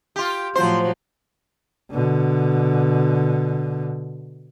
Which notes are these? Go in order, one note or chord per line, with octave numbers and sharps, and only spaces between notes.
F4 G4
A2 F3 F#3 C5
B2 D3